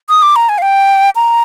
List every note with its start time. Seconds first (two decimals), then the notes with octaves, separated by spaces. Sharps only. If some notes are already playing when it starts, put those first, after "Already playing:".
0.09 D#6
0.22 D6
0.36 A#5
0.49 G#5
0.58 F5
0.62 G5
1.15 A#5